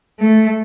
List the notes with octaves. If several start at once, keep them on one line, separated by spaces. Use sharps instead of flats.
A3